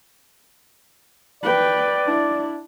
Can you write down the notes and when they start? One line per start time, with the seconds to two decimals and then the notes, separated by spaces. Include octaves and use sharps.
1.43 B4 D5 G5
2.05 D4 E4